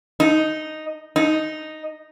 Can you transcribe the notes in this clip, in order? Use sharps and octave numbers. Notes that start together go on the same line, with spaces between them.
D#4
D#4